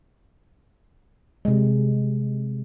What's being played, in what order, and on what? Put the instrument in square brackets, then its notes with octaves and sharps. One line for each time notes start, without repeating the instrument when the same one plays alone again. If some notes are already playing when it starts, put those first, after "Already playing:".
[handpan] C3 G#3